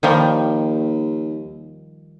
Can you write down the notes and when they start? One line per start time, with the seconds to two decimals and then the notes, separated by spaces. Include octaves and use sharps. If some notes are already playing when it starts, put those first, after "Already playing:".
0.03 D#2 D#3 F3 G3